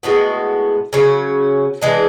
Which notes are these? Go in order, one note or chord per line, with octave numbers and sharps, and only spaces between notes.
A2 G#3 B3 F#4
C#3 F#3 C#4
E3 G#3 D4